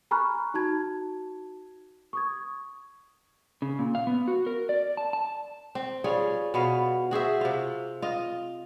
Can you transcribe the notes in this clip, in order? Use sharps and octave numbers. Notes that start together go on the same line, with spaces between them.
G#5 A#5 B5 C#6 F6 F#6
D#4 F#4 A5 G#6
C#6 D#6 G#6
C#3
A#2
F5
B3
F#4
A#4
D5
A5
A5
C4
G3 F4 G#4 C#5
B2 B3 F5
F#4 G#4 C5 E5
C3 F4
F4 D#5